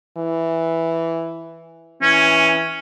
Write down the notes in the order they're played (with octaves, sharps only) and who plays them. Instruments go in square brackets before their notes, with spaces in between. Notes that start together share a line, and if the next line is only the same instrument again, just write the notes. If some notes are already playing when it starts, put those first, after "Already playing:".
[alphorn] E3
[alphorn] E3 [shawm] C#4